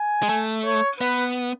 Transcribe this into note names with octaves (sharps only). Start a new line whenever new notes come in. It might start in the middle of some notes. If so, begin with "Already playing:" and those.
Already playing: G#5
G#3
A3
C#5
B3 B4